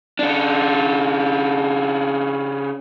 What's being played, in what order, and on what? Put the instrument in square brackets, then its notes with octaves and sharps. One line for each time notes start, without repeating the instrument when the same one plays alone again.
[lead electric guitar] C#3 D4